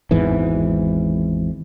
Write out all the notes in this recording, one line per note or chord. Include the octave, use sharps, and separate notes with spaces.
G#1 E2 G#2 E3